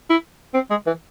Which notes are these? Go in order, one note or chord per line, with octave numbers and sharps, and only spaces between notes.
E4
C4
G#3
E3